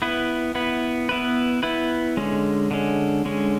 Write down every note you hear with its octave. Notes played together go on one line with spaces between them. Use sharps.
B3 E4 B4
B3 E4 B4
B3 E4 B4
B3 E4 B4
D3 G#3 C#4
D3 G#3 C#4
D3 G#3 C#4